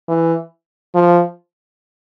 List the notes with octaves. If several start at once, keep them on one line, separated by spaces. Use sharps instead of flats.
E3
F3